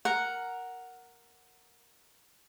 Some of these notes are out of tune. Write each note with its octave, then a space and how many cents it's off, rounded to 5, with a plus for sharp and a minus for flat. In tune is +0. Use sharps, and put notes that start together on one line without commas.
A#4 +0 F#5 +0 A#5 +0